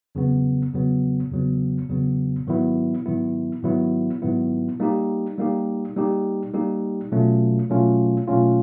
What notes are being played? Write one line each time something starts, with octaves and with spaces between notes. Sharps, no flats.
E2 C#3 F#3 B3
E2 C#3 F#3 B3
E2 C#3 F#3 B3
E2 C#3 F#3 B3
G#2 D#3 F#3 B3 E4
G#2 D#3 F#3 B3 E4
G#2 D#3 F#3 B3 E4
G#2 D#3 F#3 B3 E4
G3 A#3 D#4 G4
G3 A#3 D#4 G4
G3 A#3 D#4 G4
G3 A#3 D#4 G4
B2 F#3 A3 C#4 F4
B2 F#3 A3 C#4 F4
B2 F#3 A3 C#4 F4